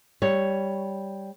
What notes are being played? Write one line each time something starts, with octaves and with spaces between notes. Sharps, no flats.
G3 C#5